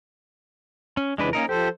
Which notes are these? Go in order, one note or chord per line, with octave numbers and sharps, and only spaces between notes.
C#4
F2 C#3 E3 G#3 D4 B4
A#3 C#4 D#4 A#4
F3 G4 A4 C5